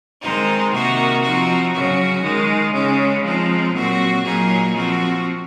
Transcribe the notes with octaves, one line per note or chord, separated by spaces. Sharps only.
D#3 G#3 C4 D#4
C3 D#3 A#3 D#4 F#4
F3 C4 D#4 F#4
C#3 F#3 C#4 F#4
D#3 G#3 D#4
C#3 G#3 C#4
F3 G#3 C4 D#4
A#2 F#3 C4 F#4
A#2 F#3 A#3 D#4 G#4
F3 C4 F#4